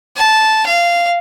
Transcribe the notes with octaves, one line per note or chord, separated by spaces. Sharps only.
A5
F5